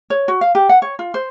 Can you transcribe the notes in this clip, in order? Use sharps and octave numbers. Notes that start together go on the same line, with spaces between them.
C#5
F#4
F5
G4
F#5
C#5
F4
C5